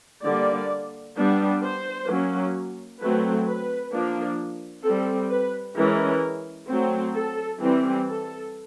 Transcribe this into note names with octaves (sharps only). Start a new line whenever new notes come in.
D3 G3 A#3 D5
G3 B3 D4
C5
F#3 A#3 C#4
F#3 A3 C4 B4
B4
F3 A#3 D4
G3 C4 A4
B4
E3 G#3 C#4 A#4
F#3 A3 C4
A4
E3 G3 C4
A4